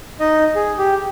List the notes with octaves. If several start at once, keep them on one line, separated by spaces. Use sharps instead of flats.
D#4 D#5
G#4
G4